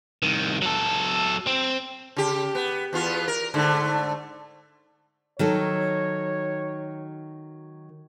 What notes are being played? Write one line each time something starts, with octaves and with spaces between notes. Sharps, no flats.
C2 D#3
F#3 A4
C4
C#3 G4
B3
E2 B3 F4
A#4
G#2 D3 A3
D#3 F#3 A4 C#5